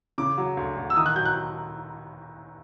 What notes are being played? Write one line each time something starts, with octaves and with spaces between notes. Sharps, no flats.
C#3 D6
F#3
D2
D2
E6
D#3 D#6
F#6
F#3 G6
F#6